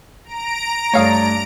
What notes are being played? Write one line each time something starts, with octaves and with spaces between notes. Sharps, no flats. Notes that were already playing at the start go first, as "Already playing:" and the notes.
A#5 D7
G2 A3 D4 C#5 F5 D#6